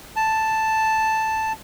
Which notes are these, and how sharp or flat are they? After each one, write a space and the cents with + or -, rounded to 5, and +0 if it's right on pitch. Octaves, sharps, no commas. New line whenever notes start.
A5 +0